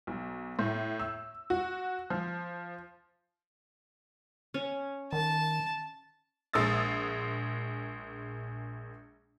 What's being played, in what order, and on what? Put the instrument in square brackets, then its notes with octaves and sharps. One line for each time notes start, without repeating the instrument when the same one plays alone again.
[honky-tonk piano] B1
A2
E6
F#4
F3
[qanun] C#4
[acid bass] D#3 [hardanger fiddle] A5
[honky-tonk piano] A#1 G#3 D#6 E6 A6